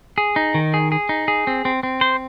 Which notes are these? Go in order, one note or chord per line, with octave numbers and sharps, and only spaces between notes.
G#4
D#4
D#3
G#4
G#4
D#4
G#4
C4
C4
C4
C5